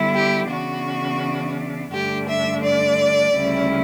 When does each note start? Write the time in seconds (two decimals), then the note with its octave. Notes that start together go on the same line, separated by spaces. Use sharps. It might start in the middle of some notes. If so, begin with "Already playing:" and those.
Already playing: D3 G3 B3 E4
0.15 G4
0.51 C#3 E3 B3 D4 F#4
1.93 G2 D3 A3 D4 G4
2.29 E5
2.64 D5
3.35 D2 C#3 G3 C#4 E4